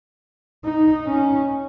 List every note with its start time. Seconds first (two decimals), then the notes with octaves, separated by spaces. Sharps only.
0.65 D#4
1.07 C#4